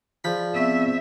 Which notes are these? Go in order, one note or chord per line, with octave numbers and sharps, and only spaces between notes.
F3 F4 G#4 D5 B5
B3 C4 E5 C#6